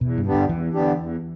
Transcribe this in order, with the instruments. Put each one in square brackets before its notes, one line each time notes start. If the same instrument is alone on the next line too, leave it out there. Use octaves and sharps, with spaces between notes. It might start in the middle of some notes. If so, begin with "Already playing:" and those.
[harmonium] E2 [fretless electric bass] B2
[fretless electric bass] G2
[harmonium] D3 B3 D4 G4
[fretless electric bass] G2
[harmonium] E2 [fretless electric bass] E3
[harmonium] D3 B3 D4 G4
E2